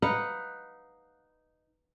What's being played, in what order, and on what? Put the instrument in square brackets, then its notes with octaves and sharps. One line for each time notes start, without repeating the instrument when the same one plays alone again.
[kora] D#4 B4 F5 F#5